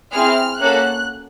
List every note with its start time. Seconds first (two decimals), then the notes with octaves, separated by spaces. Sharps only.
0.12 C4 E4 G#4 F6
0.59 A#3 C#4 F#4 A4 F#6